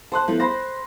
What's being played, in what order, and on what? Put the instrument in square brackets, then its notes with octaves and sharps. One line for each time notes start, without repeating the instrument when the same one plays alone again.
[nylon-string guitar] C5 [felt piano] A5 C6 F#6
[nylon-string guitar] F3 A3 [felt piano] B3 E4
[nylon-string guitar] C5 [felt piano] B5 C6 A#6